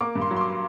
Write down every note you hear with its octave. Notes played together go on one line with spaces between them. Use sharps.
A#3 D6
G2
C6
F#3
C6
D6